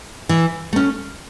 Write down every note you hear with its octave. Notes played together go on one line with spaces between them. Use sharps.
E3
A3 C#4